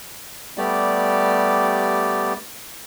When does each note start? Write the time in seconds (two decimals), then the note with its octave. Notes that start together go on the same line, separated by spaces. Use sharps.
0.58 G3 A3 B3 G4 D5